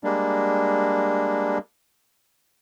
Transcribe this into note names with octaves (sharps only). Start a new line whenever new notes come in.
G3 G#3 A#3 D4